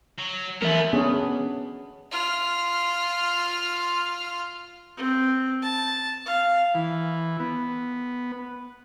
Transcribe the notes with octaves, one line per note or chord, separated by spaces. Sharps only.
F#3
E3 B3 A#4 E5
B3 C#4 D4 G#4
F4 F6
C4
A5
F5
E3
B3